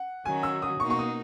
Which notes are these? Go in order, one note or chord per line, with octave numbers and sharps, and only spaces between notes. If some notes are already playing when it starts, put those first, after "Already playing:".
Already playing: F#5
D#3 F#3 C#4 F#4 G#5
E6
D#6
B2 A#3 D#4 F#4 C#6
C#6
D#6